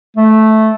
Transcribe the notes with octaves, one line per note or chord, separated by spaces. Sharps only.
A3